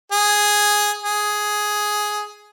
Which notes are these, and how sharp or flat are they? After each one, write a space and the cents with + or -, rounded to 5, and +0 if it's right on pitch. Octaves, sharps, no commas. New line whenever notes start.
G#4 +0
G#4 +5